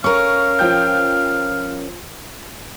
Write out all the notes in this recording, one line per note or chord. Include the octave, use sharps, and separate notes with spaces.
C#4 A#4 F5 C#6
F3 G5 G6